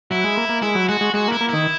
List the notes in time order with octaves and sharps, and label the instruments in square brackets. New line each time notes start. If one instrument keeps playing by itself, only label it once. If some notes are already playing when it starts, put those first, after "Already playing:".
[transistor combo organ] F#3 [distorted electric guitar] E4
[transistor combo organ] G#3
A#3
A#3
[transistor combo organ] G#3 [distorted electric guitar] E4
[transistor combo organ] F#3
[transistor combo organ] G#3 [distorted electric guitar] F#4
[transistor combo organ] G#3
[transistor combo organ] G#3 [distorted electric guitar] F#4
[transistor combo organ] A#3
[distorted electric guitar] E4
[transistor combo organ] A#3
[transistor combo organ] D#3 [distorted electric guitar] E4